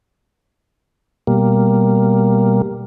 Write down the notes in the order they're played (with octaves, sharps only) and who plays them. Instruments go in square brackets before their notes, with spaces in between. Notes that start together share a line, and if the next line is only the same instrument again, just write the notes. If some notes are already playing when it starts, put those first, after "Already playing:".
[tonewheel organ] B2 G3 A#3